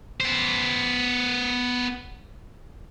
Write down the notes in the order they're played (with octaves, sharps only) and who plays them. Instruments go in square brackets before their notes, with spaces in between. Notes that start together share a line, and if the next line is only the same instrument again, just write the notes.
[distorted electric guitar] B3 C5